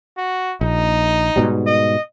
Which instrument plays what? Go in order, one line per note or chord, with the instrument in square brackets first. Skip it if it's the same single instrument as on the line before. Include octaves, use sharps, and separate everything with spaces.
[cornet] F#4
[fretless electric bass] A#1 [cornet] D#4
[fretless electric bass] G#2 B2 G3
[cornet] D#5